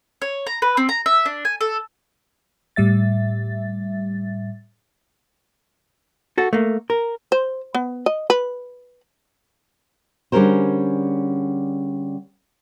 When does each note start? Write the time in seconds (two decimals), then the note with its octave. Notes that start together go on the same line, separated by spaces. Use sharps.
0.22 C#5
0.47 A#5
0.62 B4
0.77 C4
0.89 A#5
1.06 E5
1.26 D4
1.45 G#5
1.61 A4
2.76 A2 G3 E5 A6
6.38 F#4 A4
6.53 A3 A#3
6.90 A#4
7.32 C5
7.75 B3
8.06 D#5
8.30 B4
10.32 D3 G3 C#4 G#4 A#4 C5